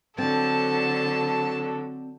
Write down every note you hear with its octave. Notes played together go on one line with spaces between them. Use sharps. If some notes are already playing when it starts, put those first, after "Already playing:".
D3 F#3 C4 D4 A4 A5